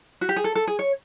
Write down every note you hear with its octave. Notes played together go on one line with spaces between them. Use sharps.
F#4
G4
G#4
A4
A4
G#4
C#5